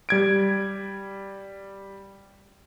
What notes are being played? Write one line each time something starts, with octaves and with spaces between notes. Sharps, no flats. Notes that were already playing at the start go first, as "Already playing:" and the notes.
G3 G#6 D7